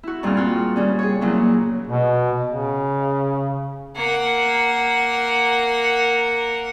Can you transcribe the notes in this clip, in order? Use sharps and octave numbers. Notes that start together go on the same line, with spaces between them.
E4 F#4
G2 A#2 G3 C4 G#4 F6
F4 F#4
C#3 G3 C#4
G#4 C#5
A#2 C#3 F#3 A#3 C#4 E4
B2
C#3
A#3 F#5